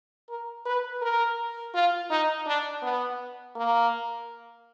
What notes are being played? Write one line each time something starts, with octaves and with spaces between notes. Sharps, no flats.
A#4
B4
A#4
F4
D#4
D4
B3
A#3